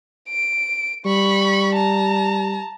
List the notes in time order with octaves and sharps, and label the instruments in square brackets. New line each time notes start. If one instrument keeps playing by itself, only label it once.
[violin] D7
[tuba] G3 [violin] B5 C#6
[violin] A5 A#5